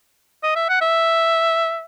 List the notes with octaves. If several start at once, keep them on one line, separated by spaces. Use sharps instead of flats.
D#5
E5
F#5
E5